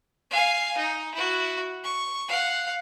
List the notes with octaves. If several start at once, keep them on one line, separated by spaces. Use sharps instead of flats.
F5 G#5
D#4
E4 F#4
C#6
F5 F#5